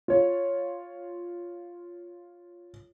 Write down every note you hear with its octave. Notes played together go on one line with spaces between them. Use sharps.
F4 C#5